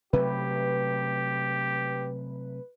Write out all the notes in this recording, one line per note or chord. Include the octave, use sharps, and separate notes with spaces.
C3 F#3 A3 G4 B4